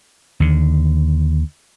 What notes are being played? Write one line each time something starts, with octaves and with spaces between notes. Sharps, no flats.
D#2 D3